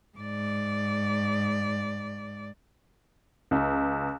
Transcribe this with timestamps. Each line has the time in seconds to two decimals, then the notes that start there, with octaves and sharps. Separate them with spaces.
0.17 G#2 D5
3.51 C#2